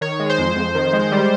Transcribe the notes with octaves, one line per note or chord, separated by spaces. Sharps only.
D#3 C#5
G#3
C5
F2
F2
D#3
G#3
G3